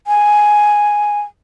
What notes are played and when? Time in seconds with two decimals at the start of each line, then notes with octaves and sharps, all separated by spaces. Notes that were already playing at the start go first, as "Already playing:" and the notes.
0.07 G#5